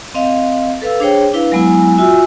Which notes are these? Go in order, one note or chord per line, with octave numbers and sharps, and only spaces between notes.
C4 D#5 F5
A4 B4 F5 E6
D4 G#4 C5 C#5 G5
D4 E4 B4 F5
F#3 G#3 B3 E4 G#5
F4 F#4 E5 G#5 E6